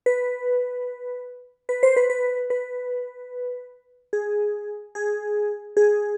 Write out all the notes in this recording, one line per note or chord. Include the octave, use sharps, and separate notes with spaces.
B4
B4
C5
B4
B4
B4
G#4
G#4
G#4